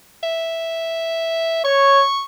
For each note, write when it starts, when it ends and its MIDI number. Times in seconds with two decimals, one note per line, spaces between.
0.23 1.60 76
1.65 2.03 73
1.65 2.24 85